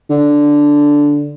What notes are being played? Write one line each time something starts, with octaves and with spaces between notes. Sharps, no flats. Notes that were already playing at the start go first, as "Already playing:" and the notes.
D3